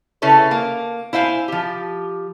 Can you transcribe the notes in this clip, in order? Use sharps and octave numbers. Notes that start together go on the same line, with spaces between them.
C#3 C#4 E4 A4 B4
A#3
E4 C5 F5 G5 G#5
F3 G4